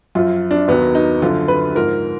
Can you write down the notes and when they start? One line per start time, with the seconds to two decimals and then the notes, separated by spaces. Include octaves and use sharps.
0.15 F#2 F3 F4
0.51 D4
0.68 D#2 D#3 F#3 B3
0.95 D#4
1.22 F#2 D3 F3 F4
1.48 B4
1.75 G#2 F3 A#4